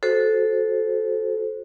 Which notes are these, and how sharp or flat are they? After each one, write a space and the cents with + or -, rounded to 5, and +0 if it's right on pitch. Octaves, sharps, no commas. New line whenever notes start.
F#4 -15 A4 -15 C5 +0